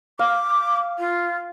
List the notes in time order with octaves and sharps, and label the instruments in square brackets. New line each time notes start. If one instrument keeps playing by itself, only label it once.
[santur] F5 [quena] D6
[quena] F4